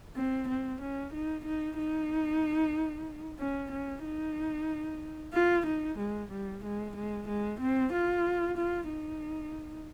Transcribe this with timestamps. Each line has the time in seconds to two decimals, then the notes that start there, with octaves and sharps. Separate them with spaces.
0.16 C4
0.48 C4
0.81 C#4
1.13 D#4
1.45 D#4
1.78 D#4
3.39 C#4
3.72 C#4
4.04 D#4
5.33 F4
5.66 D#4
5.98 G#3
6.31 G3
6.64 G#3
6.96 G#3
7.28 G#3
7.60 C4
7.93 F4
8.57 F4
8.89 D#4